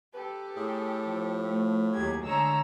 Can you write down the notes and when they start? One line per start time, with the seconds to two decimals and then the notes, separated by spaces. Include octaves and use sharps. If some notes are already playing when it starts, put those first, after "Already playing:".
0.14 G4 A4 B4
0.56 A2 G#4
1.06 F3
1.45 A3
1.94 D#2 F#3 G4 G#4 G#6
2.24 D3 G#3 G#4 C#5 A#5 E6